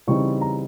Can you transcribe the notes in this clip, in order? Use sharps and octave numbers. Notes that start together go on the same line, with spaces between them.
C#3 E3 G3 C4 D#4 C#6
A#5